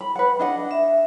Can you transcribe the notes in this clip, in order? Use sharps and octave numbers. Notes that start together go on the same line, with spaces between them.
B5
B4 F#5
D4 D#5 F#5
E5